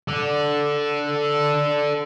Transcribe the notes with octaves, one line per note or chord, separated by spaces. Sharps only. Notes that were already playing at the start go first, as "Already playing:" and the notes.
A4 D5